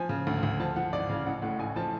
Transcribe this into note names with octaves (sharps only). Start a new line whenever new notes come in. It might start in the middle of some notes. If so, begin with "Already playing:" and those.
Already playing: F3 G#5
C#3
D2
D2
F3 A5
F3 F#5
G#1 D5
C#3 F5
A1 F#5
A2 F#5
A1 G#5
F3 A5